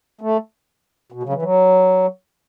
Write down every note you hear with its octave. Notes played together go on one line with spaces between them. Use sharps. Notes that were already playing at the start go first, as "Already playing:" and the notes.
A3
B2
C#3
F#3
E3
F#3